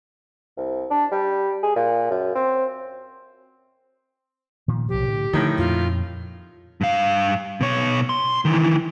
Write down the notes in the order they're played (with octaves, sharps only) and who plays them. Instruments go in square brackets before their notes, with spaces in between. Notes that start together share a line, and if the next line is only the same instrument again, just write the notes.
[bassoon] C2
D4
G3
G#4
A#2
F#2
C4
[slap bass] A#2 D#3 F3
[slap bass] B1 A#2 F3 [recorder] G4
[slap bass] A2 D3
[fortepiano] A2 D#3 [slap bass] D3 F3
[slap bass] F2 A#2 [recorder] F4
[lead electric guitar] G2 F5
B2 C#5
C6
D#3 E3